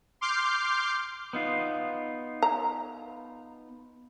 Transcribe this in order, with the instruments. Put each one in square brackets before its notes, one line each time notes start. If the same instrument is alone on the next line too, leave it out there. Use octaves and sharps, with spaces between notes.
[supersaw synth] C6 D6 F6 G6 C7
[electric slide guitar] B3 D#4 F4
[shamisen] A#5